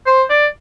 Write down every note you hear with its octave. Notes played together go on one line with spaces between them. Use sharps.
C5
D5